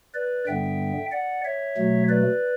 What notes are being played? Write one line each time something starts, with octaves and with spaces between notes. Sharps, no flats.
B4 D5
G2 D3 G3 B3 E5 G5
D5 F#5
C#5 E5
B2 F#3 A3
B4 D5